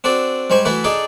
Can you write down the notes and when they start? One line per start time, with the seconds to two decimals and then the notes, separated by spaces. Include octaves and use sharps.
0.04 C4 D4 F#4 A4 D5
0.50 G#2 G3 C5 G#5 C#6
0.65 E3 A3 E4 F#4 A4 B4
0.84 D4 D#4 G#4 A4 D5